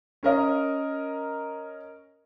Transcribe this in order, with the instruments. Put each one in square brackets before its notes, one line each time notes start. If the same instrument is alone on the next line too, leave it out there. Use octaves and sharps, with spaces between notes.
[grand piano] C#4 A#4 D#5